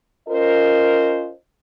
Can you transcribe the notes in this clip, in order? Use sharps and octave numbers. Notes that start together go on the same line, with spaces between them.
C#4 F4 A#4 C5 D#5